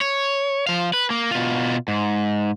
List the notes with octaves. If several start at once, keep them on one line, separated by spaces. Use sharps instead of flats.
C#5
F3 F5
B4
A#3
B2 F4
G#2